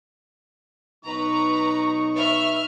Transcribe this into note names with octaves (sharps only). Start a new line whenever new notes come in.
B2 F#3 D#4 B4 A#5 C#6
B4 E5 F6